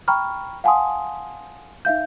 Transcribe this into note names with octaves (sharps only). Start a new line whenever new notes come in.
G5 A#5 B5 C#6 F6
F5 F#5 G#5 A5 C6 D#6
D#4 E5 F5 G6